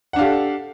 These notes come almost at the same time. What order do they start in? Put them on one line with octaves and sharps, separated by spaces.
F#5 D4 F5 G4 A4